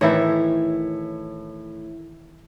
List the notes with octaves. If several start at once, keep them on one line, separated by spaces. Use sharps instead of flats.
A2 D#3 E3 E4 A4 C#5